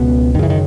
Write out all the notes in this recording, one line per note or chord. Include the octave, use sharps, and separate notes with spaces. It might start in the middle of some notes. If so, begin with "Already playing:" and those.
Already playing: C#2 B2 B3
F#2 C#3 D#3 E3
D#3